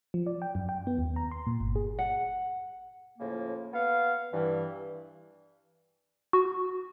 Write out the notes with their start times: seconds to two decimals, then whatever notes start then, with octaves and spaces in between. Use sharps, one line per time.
0.14 F3
0.27 D5
0.42 G5
0.55 F#2
0.69 G5
0.87 B3
0.98 D#2
1.16 A#5
1.31 C6
1.47 A#2
1.60 G1
1.76 G#4
1.99 F#5
3.19 A2 C#3 F3 A#3
3.73 B3 F5
4.32 G2 E3
6.33 F#4